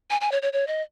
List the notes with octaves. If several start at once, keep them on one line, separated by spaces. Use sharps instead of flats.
G#5
G#5
C#5
C#5
C#5
D#5